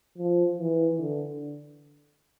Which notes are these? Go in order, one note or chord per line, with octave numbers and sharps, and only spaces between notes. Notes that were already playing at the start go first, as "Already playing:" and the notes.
F3
E3
D3